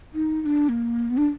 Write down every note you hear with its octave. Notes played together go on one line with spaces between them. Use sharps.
D#4
D#4
D4
A#3
B3
D4